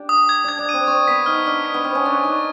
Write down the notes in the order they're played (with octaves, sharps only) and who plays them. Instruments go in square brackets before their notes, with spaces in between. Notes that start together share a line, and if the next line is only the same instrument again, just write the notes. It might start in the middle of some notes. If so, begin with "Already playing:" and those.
Already playing: [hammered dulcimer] D4 G4
[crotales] D#6
G#6
[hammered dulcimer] D4 [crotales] G#6
[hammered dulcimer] D4
[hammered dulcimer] C4 [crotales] D#7
[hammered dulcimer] C4 [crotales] C#6
[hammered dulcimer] B3 [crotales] B6
[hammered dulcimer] D#4 [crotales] F6
[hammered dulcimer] D4 [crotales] F6
[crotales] B6
[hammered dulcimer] B3
[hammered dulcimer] C4 [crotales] F6
[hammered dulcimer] C#4
[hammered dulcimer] D4 [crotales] C#6
[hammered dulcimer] D#4 [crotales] C#6